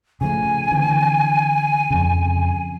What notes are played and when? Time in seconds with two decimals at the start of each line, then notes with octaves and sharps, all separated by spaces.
0.21 C#3 F3 A3 G#5
0.71 D3 E3 C4
1.91 F2 C#3